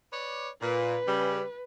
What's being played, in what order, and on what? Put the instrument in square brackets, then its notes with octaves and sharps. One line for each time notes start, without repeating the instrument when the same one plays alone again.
[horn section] B4 C#5 D5
[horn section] A#2 [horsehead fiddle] B4
[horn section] C#3 G3